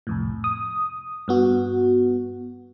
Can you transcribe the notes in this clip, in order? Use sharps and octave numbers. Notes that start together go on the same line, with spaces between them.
C2 F2 A2
D#6
G2 B3 F#4